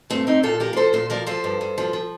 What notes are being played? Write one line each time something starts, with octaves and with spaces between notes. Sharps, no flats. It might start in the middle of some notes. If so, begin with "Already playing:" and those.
G2 A3 C4
A#2 C4 D#4
A#2 F4 A4
F3 G4 A#4
A#4
F3 A4 C5
A#2 A4 C5
F3 A#4 D5
F3 A4 C5
G2
G2
F3
F3